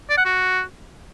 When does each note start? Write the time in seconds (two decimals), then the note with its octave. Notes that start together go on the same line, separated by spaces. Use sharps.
0.10 D5
0.17 F#5
0.25 F#4